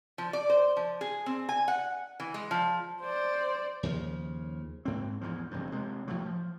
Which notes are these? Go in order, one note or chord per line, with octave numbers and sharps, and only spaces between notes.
F3
D5
C5
F3
G#4
C4
G#5
F#5
E3
G#3
F3
C5 D5
D#2 C#3 F3
G#2 C4
E2 G#2 F3
F1 G2
C3 G#3
A2 F3 F#3
F3